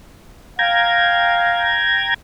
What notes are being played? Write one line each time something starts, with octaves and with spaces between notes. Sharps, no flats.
F5 G5 A#5 G#6